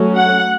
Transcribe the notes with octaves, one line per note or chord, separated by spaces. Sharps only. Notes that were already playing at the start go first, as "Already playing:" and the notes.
Already playing: F#3 A3 C#4
F#5